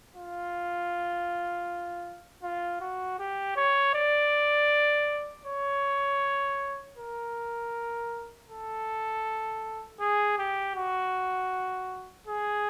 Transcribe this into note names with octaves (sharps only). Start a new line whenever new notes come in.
F4
F4
F#4
G4
C#5
D5
C#5
A#4
A4
G#4
G4
F#4
G#4